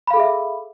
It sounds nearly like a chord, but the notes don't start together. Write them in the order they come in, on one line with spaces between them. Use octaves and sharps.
B5 F5 A4 G#4 E5